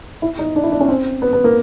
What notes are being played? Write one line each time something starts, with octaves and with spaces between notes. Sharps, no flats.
E4
D#4
D4
E4
D4
C#4
C4
B3
B3
A#3